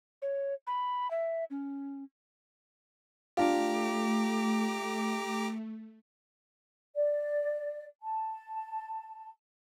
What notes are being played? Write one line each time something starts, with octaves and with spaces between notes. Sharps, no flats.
C#5
B5
E5
C#4
A3 D4 F4 G4 A#5 D6
D5
A5